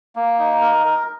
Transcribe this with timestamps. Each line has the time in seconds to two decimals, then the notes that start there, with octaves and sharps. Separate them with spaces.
0.16 A#3
0.39 D#4
0.61 A#4
0.85 A#4